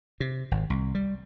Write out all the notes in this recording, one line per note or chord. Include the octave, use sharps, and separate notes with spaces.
C3
G#1
C2
G3